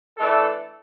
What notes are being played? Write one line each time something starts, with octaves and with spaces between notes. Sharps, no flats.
E3 A3 D4 A4